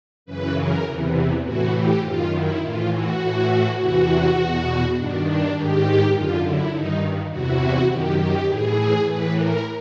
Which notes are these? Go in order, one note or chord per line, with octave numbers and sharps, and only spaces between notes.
F#2 C#3 E3 B4
A#4
E2 C3 E3
A2 E3 F#4
G4
F#2 D#3 F4
E4
A2 E3 F4
F#4
A2 E3
E2 C3 E3 F#4
E2 B2
G2 D#3 D4
D4
G#2 D#3 G4
F#2 D3 F4
E4
G2 D#3 D#4
E2 C3 E3 F#4
F#2 D#3 G4
G4
A2 E3 G#4
A2 E3 B4
A#4